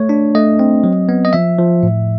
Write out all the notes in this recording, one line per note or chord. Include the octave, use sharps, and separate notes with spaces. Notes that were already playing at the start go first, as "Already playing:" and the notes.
Already playing: A3 C#5
D4
A3 D#5
C4
F#3
B3
D#5
F3 E5
F3
A2